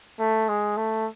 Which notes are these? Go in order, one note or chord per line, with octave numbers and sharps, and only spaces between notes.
A3
G#3
A3